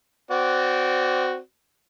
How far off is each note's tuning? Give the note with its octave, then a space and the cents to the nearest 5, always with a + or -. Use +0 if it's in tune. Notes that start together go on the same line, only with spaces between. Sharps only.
C4 -20 F#4 +0 D5 -20